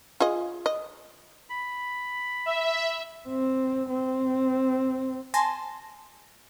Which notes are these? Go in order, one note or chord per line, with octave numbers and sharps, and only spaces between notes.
F4 G#4 D#5
D#5
B5
E5
C4
C4
G#5 A5 C6 A#6